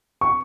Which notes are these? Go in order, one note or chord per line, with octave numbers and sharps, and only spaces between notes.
C#6